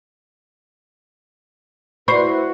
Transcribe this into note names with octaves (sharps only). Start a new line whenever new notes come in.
E4 F#4 B4 C5 B5 C#6